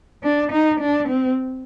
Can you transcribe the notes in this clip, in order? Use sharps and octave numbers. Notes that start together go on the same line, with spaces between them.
D4
D#4
D4
C4